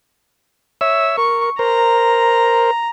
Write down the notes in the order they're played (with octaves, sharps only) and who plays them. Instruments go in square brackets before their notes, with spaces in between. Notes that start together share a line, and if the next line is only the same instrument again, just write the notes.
[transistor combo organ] C#5 E5 E6
[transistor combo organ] A#4 [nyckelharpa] C#6
[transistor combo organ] A#4 C5 [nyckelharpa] A#5